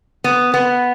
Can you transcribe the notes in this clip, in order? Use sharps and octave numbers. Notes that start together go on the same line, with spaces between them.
B3
B3